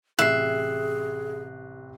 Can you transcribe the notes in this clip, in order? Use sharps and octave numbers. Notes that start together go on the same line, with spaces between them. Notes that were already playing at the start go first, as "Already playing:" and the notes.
A1 C3 G#4 E5 F#6 C7